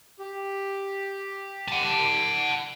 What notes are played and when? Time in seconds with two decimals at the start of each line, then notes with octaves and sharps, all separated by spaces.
0.19 G4
1.68 F#5 A5